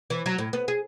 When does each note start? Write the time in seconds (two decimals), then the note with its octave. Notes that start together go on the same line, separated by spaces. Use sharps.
0.10 E3
0.26 F#3
0.38 A2
0.53 B3
0.68 G#4